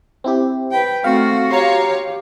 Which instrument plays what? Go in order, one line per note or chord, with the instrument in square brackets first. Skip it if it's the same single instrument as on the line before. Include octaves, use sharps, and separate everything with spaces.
[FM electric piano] C4 E4 G4
[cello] B4 G5
[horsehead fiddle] A3 C4 [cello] F#4 [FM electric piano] F5
[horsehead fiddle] G4 [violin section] C#5 F5 [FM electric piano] A#5 C6